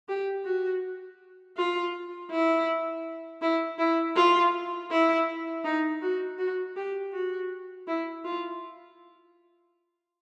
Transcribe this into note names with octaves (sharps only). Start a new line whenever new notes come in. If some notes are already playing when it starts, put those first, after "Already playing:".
G4
F#4
F4
E4
E4
E4
F4
E4
D#4
F#4
F#4
G4
F#4
E4
F4